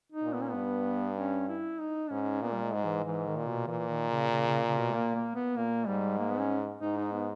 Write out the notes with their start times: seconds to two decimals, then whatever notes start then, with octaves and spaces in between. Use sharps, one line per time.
0.12 D#4
0.23 A#2
0.33 B3
0.42 C#4
0.50 G2 B3
1.17 C#4
1.49 E4
1.80 D#4
2.10 G#2 C#4
2.42 A#2 B3
2.54 G3
2.63 G#3
2.74 G#2
2.85 E3
3.05 G#2 E3
3.26 D#3
3.36 A#2
3.47 B2
3.67 A#2 E3
3.88 D#3
4.09 C#3
4.31 C#3
4.47 C#3
4.67 C#3
4.78 B2
4.93 A#3
5.15 A#3
5.35 B3
5.56 A#2 A#3
5.87 G#2 G3
6.19 A#3
6.30 B3
6.40 C#4
6.81 G#2 D#4
6.97 D#4
7.13 B3